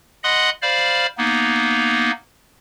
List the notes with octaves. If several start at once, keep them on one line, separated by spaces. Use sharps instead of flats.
D#5 F#5 B5 C6 D#6 F#6
C5 D5 F5 B5 F6
A#3 B3 D#4